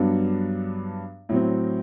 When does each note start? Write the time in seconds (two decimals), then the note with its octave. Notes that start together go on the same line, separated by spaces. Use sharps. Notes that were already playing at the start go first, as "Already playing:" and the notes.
Already playing: G2 F#3 B3 D4
1.29 A2 F#3 C4